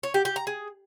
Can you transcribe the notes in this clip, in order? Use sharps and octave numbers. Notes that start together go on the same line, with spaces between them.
C#5
G4
G4
A#5
G#4